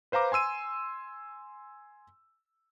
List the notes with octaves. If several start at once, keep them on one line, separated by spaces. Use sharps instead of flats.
B4 C5 F5 A#5 D6
G#5 C6 E6 D#7